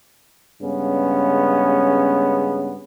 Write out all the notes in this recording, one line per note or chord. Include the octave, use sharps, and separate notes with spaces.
G2 C#3 G#3 B3 C#4